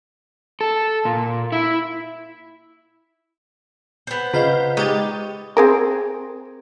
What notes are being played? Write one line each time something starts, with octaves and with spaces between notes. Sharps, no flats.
A4
A#2
E4
B3 C5
C#3 F4 B4 D#5 F5 B5 G6 B6
G#3 D#4 G4 C#6 A6
C4 G#4 A#4